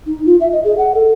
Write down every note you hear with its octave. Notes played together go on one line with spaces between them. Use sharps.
D#4
F4
E5
D#5
G#4
F#5
A4